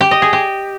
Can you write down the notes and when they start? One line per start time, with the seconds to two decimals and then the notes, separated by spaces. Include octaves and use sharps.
0.01 G4
0.11 D#5
0.22 G#4
0.33 G4